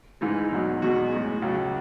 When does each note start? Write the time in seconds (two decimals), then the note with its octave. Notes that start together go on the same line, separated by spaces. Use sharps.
0.21 G#2 E3 G#3 D#4
0.51 E2 B2 F#3
0.82 E2 B2 G#3 F#4
1.12 A2 G#3
1.42 C#2 C#3 F#3